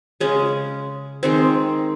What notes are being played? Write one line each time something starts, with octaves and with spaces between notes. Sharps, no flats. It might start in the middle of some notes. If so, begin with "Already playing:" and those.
C#3 G#3 C#4
D#3 G#3 C4